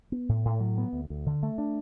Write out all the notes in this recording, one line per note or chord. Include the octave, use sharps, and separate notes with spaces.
B3
A2
A2
F#3
B3
D2
D2
D3
A3
D4